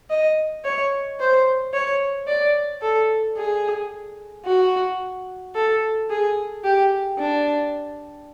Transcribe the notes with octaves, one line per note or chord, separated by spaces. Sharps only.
D#5
C#5
C5
C#5
D5
A4
G#4
F#4
A4
G#4
G4
D4